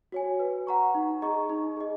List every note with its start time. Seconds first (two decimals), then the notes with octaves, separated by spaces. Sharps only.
0.12 F#4 C#5 G#5
0.39 B4
0.67 F#5 A#5 C#6
0.95 D#4
1.22 G#4 D#5 A#5 C#6
1.49 D#4
1.77 G#4 D#5